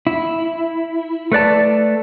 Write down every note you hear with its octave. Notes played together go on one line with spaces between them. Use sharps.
E4
A3 B4 D5 A5